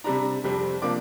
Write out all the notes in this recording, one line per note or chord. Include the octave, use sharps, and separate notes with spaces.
C3 G3 D4 A#5
F2 C3 G3 C4
C3 F3 A#3 D4 D6